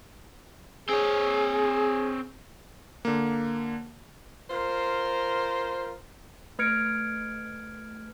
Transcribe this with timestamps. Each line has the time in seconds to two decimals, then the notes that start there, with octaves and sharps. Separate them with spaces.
0.89 C4 G#4 C#5
3.05 D3 A#3
4.50 F4 A#4 C5
6.59 A3 B4 F6 G#6 C#7 D7